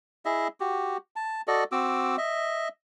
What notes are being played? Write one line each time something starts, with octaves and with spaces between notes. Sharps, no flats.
E4 G#4 D#5 E5
F#4 G4
A5
F#4 A4 D5 D#5
C4 F#4 D6 E6
D#5 E5